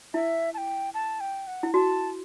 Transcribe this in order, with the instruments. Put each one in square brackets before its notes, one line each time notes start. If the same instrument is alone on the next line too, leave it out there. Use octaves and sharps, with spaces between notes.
[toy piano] E4 [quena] E5
[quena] A5
G5
A5
G5
F#5
[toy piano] E4
[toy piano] F#4 [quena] A5